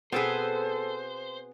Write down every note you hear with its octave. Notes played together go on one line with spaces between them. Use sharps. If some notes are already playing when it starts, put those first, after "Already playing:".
B2 B3 C4 G#4 A4 B4 C5